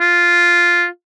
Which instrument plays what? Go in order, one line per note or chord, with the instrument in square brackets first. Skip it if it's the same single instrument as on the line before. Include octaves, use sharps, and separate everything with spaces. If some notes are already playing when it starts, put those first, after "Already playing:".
[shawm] F4